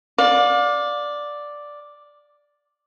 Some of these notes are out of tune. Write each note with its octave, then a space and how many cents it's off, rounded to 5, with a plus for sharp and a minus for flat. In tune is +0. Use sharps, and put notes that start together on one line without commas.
D5 +0 F5 +35